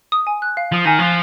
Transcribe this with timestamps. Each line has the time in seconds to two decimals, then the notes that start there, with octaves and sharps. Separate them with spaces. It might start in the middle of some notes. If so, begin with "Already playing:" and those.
0.12 D#6
0.27 G#5
0.42 F#6
0.57 F5
0.72 F3 D#6
0.85 D#3 G#5
0.99 F3 F#6